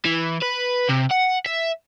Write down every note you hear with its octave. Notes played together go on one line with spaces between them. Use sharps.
E3
B4
C3
F#5
E5